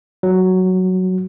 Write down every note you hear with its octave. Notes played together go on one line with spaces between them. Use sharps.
F#3